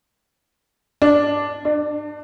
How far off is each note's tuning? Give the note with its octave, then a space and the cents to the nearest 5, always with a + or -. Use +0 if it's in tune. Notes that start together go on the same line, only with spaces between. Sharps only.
D4 -5
D4 +30